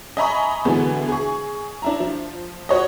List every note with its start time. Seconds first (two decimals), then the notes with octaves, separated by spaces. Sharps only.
0.17 D#5 E5 G#5 A#5 B5 C#6
0.65 B2 D3 E3 G#3 B3
1.09 G#4 C#6
1.82 D4 E4 A#5
2.00 F3
2.69 F#4 C#5 D#5